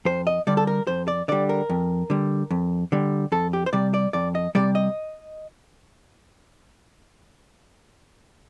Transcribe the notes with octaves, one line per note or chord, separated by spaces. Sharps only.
F2 C5
D#5
D3 G3 D5
A4
A#4
F2 C5
D5
D3 G3 D5
A#4
F2
D3 G3
F2
D3 G3
F2 A4
G4
C5
C3 G3 D5
D5
F2 D5
D#5
C3 G3 D5
D#5